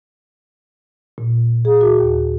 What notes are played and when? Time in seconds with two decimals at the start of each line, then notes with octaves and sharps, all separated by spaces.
1.18 A#2
1.65 G#4
1.81 F#4
2.00 D#2